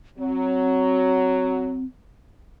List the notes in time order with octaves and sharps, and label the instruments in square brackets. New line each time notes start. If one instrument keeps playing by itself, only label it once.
[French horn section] F#3 [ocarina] C4